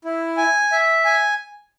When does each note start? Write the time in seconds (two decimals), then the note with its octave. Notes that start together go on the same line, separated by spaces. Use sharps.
0.05 E4
0.37 G#5
0.72 E5
1.05 G#5